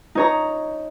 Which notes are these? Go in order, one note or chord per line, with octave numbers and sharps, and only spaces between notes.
D#4 C#5 A#5